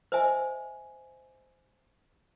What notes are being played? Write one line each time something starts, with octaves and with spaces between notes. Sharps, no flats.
C5 D#5 E5 G#5